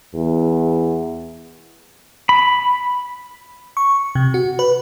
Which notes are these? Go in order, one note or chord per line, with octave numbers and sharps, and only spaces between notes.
E2
B5
C#6
C3
F#4
B4